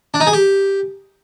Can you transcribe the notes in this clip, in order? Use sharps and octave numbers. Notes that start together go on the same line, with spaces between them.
D4
D#4
G#4
G4